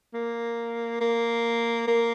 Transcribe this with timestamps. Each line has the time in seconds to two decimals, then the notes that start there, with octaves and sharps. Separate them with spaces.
0.14 A#3
1.01 A#3
1.87 A#3